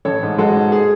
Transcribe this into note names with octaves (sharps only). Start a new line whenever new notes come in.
A1 A4 C#5
G#2
G#3 F#4 A4
G#2
G#4